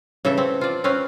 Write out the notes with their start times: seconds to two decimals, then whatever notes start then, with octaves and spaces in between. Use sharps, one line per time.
0.25 C#3 E3 A4 E5
0.37 C4
0.61 F4 D5
0.84 C4 C#4 B4 F5